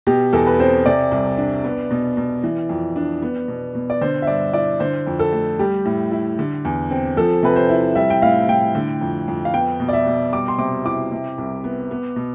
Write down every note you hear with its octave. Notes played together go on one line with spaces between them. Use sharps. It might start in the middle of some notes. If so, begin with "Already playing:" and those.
B2 G4
E2 A4
B4
C4 C5
C3 D5
C2
D4
B3
B2
B2
E3
F2
D4
B3
B2
B2
D5
D3 C5
E5
G2 D5
E4 D5
D3 C5
F2
A4
A3
G3 G4
A2
E4
D3
E2
C4
F3 A4
C3 B4
C5
E4
G3 E5
G5
A2 F5
A2 G5
D3
F2
F2
F5
B3 G5
B2
D5
E5
B2
G3 D6
C6
C3 D6
E4 D6
C3
C2
B3
B3
B2